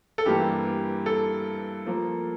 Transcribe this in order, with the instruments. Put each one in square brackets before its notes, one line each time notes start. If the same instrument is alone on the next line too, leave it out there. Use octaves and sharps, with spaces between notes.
[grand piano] A4
[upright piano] G2 E3 G3 A#3 [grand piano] G4
[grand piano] A4
[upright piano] F3 A#3 A#4